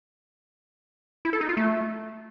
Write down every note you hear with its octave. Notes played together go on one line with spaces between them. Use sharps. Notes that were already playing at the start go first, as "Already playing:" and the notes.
E4
A4
D#4
F4
A3